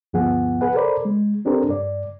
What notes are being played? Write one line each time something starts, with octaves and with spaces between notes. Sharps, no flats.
D2 G2 F3 B3 G#4 F#5
G#4 B4 F#5
A4 A#4 C5 D5 B5
G#3
C4 D4 G4 A4 A#4 C5
G2 D5